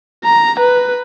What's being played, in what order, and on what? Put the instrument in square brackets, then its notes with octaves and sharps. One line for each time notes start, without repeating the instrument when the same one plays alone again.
[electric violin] A#5
B4